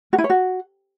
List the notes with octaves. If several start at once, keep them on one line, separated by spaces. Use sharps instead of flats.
F#4
E4
C#5
F#4